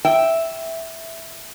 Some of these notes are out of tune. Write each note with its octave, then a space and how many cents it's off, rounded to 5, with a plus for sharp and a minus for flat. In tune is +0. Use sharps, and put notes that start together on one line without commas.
E5 -5 G5 +0